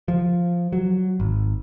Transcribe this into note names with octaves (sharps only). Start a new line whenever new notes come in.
F3
F#3
G#1